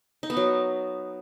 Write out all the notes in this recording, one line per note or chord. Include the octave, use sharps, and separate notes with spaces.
D#4
B3
F#3